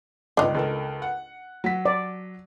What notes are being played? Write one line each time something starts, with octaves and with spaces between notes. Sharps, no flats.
G1 C#2 D4 D#4
C#2 A4 A#4
F#5
F#3 B6
D5